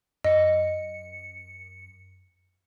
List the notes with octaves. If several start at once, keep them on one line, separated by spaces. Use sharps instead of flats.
F#2 D#5 C#7